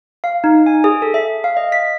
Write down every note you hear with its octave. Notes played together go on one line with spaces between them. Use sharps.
F5
D#4
G#5
G#4
A4
E5
F5
D#5
B6